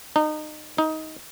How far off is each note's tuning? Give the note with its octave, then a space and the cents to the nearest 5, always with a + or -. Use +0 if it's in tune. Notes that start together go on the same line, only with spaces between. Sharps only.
D#4 -30
D#4 +15